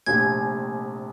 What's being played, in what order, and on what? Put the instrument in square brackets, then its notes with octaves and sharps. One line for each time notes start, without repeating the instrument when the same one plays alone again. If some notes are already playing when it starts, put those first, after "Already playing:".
[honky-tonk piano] F1 A#1 [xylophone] G#6